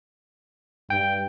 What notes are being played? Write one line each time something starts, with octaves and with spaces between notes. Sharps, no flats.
G2 G5